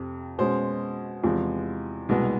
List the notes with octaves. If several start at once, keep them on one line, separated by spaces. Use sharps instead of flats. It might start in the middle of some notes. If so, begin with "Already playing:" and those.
Already playing: F2 C3
B2 G#3 C#4 C5
E2 C3 F3 G#3
C2 B2 G#3 B3